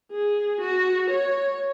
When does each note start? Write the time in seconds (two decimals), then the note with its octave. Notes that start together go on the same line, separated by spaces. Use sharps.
0.11 G#4
0.61 F#4
1.10 C#5